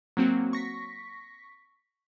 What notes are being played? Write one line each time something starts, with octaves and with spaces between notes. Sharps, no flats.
F#3 A#3 C4 F#4
C#6 A#6 B6